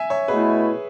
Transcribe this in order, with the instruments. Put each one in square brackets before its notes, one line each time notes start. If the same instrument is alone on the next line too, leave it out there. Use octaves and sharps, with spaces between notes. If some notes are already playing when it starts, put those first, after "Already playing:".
Already playing: [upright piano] E5 G#5
C#5 E5
[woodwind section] B2 A3 E4 [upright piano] G#4 B4